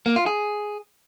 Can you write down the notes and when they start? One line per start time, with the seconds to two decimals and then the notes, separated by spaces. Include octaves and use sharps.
0.06 A#3
0.16 F4
0.26 G#4